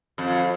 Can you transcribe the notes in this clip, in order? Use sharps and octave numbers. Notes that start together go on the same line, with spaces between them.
F2